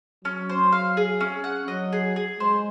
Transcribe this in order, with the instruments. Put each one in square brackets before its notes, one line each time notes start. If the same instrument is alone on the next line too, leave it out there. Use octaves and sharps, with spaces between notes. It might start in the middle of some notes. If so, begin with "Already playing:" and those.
[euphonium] F#3 [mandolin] C#4
[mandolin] C5
F5
G#4
C#4
F#5
[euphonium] F#3 [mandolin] D#5
[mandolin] G#4
G#4
[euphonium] G#3 [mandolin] C5